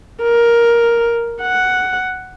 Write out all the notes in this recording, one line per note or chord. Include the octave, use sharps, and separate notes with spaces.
A#4
F#5